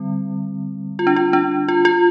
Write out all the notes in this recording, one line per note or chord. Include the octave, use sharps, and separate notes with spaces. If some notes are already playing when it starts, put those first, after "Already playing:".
Already playing: D3 G3 C4
F4
D4
F4
D4
F4
F4